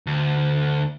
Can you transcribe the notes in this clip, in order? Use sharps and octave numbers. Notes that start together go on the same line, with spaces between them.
D2